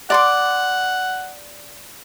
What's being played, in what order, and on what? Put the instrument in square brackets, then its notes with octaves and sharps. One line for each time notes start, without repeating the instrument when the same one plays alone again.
[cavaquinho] D5 C6 D6 [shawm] F#5